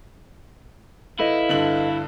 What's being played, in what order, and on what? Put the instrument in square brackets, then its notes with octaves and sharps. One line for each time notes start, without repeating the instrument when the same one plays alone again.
[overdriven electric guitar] E4 [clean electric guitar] A4 B4 D#5 [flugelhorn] F5
[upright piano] G2 D3 F#7